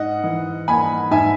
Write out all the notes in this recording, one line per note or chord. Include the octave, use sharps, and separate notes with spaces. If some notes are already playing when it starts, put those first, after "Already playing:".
Already playing: G#2 D#5 F#5
E3
A#3 G#5 B5
G#2 E5 G#5